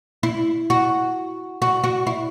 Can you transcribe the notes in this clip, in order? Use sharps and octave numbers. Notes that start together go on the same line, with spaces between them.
E4
F#4
F#4
F#4
E4